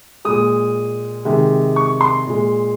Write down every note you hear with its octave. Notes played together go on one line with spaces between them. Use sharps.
A#2 G#3 D#6
C3 D#3 G#3
C#6
C6
A#2 G#3